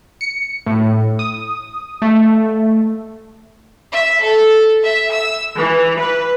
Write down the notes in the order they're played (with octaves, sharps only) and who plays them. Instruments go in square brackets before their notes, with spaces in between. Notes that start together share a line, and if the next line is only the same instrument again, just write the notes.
[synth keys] C#7
A2
D#6
A3
[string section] E5
A4
E5
E6
E3
B4